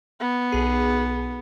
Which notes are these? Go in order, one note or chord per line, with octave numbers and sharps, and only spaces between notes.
B3
B1 G#4